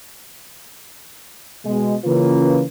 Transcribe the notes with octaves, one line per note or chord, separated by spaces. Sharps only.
B2 G#3
C#3 E3 A#3 C#4 F4 B4